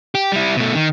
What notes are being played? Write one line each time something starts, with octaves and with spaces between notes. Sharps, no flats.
G4
G3 E4
B2 A3
D#3